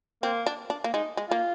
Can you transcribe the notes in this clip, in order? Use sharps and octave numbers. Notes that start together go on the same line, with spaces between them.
A#3 C4
D4
D4
A#3
G#3 D#4
G#3
A#3 F4